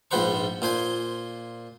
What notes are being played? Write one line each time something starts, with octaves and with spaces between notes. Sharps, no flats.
A#1 G#2 F3 B4 C5 C#6
A#2 C5 G#5 C6